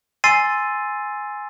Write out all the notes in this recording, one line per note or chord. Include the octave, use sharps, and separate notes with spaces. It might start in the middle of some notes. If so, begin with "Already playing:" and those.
G#5 C6 E6 A6 C7 D#7